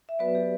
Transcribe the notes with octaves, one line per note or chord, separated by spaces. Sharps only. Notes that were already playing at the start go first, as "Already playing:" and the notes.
E5
F#3 B3 F#4 B4 D5
G4